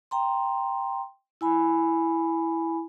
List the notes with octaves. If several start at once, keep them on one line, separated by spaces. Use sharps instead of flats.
G5 A#5 C6
E4 G#5 B5